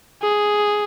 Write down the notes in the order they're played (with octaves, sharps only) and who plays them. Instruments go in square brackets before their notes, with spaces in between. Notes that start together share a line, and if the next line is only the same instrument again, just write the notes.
[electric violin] G#4